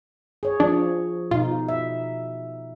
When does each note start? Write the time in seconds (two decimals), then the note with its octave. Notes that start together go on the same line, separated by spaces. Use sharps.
0.43 G#4 C#5
0.60 F3 D4
1.31 B2 D#4 F4
1.69 E5